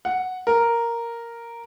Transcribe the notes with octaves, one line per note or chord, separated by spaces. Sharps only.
F#5
A#4